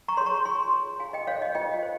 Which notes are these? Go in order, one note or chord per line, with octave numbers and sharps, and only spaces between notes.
A#5 C#6
G#4 C#5 C6
A#5 C#6
F4 G#5 C6
G#4 C#5
F4 F5 G#5
D#5 G5
C5 C#5 F5
D#5
F4 D#5 G5
C5